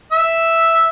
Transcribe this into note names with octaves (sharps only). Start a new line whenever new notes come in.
E5